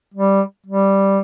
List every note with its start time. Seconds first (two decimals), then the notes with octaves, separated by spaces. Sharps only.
0.14 G3
0.66 G3